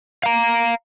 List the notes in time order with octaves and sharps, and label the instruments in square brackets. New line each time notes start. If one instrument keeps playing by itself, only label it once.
[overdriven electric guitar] F5 A#5